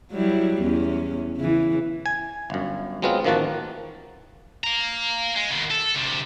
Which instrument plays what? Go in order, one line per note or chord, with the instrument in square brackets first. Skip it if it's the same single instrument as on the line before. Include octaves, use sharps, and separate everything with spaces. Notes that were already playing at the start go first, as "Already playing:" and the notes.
[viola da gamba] F#3 G3 E4
E2 C#4
C#3 E3
[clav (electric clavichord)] G#5
G1 F#2
F#3 G#3 B3 C4 F4
A1 D#3 F3 A#3 F#4 A5
[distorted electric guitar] F5 A#5
G#3
B2 D#3
A4
D2 C3